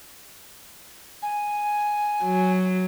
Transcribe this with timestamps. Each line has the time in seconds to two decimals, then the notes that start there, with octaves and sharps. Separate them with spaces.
1.22 G#5
2.24 F#3